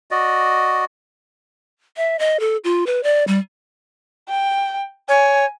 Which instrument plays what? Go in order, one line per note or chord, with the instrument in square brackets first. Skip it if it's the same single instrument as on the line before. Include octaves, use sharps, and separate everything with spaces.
[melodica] F#4 D5 D#5
[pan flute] E5
D#5
A4
F4
B4
D5
G3
[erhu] G5
[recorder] C#5 [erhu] G#5